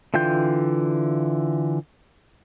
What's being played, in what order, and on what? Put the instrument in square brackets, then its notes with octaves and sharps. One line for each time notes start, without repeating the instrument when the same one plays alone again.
[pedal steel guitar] D3 E3 F4 G5 G6